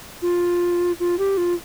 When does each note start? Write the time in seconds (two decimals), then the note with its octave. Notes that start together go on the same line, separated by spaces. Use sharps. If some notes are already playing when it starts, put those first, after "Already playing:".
0.22 F4
1.00 F4
1.19 G4
1.37 F4